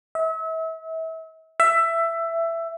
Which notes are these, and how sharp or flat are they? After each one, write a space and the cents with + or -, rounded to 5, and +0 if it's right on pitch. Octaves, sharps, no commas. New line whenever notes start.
E5 -35
E5 +15